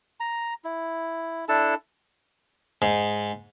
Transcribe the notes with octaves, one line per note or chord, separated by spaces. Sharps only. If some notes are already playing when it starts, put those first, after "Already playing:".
A#5
E4
D4 E4 A4 A5
G#2